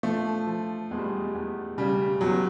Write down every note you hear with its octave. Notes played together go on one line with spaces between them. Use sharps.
F3 A3
F3
E2 G#3
G3
G#3
E2
C#3 G3
E2 F#3